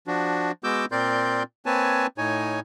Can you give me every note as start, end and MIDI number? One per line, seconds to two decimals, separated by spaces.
0.07 0.51 53
0.07 0.51 62
0.07 0.51 66
0.64 0.85 56
0.64 0.85 59
0.64 0.85 66
0.64 0.85 86
0.64 0.85 88
0.64 0.85 91
0.92 1.43 46
0.92 1.43 60
0.92 1.43 70
0.92 1.43 74
0.92 1.43 84
0.92 1.43 91
1.66 2.07 58
1.66 2.07 60
1.66 2.07 71
1.66 2.07 73
1.66 2.07 80
1.66 2.07 81
2.18 2.60 45
2.18 2.60 63
2.18 2.60 73
2.18 2.60 80